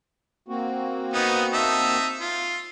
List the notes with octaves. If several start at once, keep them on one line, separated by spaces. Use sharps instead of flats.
A#3 C4 F#4
B3 D#4
D#4 E5 A5
F4